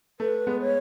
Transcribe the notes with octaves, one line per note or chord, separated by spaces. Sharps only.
A3 B4
G#3 B3
C#5